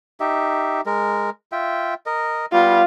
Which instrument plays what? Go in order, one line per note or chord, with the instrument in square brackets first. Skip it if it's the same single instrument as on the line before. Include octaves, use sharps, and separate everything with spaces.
[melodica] D#4 G4 E5
G#3 A#4
F4 E5 G5
A#4 D#5
[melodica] G3 B3 G4 [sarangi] F4